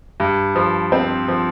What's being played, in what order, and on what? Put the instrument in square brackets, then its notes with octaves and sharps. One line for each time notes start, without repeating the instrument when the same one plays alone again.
[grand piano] G2
F3
C4
F3